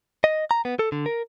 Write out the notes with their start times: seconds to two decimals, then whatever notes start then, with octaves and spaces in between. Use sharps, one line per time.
0.24 D#5
0.51 A#5
0.65 B3
0.79 A4
0.92 D3
1.06 A#4